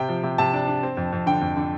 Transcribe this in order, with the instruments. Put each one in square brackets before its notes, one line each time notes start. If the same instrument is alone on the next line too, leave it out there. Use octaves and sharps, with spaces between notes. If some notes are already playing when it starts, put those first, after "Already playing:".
Already playing: [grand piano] C3 G5
F3
C3
C3 A5
D4
D4
C4
F2
F2
D3 G5
F2
D3